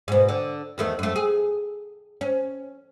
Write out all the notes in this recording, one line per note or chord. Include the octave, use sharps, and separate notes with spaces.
G#2 B2
D3
E2 D#3 A3
F#2 A3
G#4
C#4